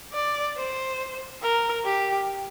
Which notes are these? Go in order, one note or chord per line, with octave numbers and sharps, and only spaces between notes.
D5
C5
A#4
G4